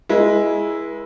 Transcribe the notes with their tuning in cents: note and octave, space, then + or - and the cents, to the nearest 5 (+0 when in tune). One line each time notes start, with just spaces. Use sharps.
G#3 +0 E4 +0 B4 -40